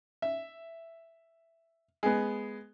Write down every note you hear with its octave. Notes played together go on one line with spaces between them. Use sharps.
E5
G#3 B3